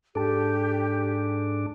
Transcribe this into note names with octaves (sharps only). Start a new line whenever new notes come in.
G#2 D4 G4 A4 A5